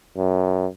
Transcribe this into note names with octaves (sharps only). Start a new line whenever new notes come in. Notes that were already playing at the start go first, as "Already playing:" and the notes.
F#2